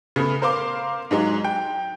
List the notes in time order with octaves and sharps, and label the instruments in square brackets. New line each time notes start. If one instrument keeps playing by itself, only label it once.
[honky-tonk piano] C#3 A3 B3
A#4 C5 F5 C6 D6
G#2 F#3 G#3
G5